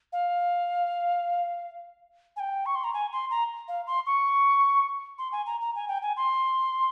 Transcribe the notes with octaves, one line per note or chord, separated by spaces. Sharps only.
F5
G#5
G5
C#6
C6
A#5
G#5
C6
A#5
F5
C6
C#6
C6
G#5
A#5
A#5
G#5
G5
G#5
C6